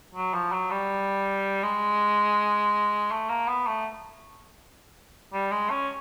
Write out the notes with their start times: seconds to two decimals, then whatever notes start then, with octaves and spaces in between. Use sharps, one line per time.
0.15 F#3
0.34 F3
0.52 F#3
0.71 G3
1.63 G#3
3.11 A3
3.29 A#3
3.48 B3
3.67 A3
5.33 G3
5.51 G#3
5.70 C#4